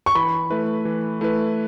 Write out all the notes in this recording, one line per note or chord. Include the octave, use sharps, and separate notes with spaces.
C#6
E3 B5
A3 E4 B4
E3
A3 E4 B4